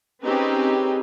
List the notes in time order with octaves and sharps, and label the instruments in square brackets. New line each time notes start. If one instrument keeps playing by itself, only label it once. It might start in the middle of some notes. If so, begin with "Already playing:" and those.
[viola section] C4 C#4 D#4 G4 G#4 B4